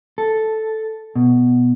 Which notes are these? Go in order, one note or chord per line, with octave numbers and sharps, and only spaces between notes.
A4
B2